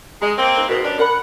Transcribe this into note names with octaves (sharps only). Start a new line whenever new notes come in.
G#3 D#5 A#5
A#3 C4
D#4 B4 D#5
G#2 B2 A#4
G3 C#4 D4
A#4 C#5 F#5 B5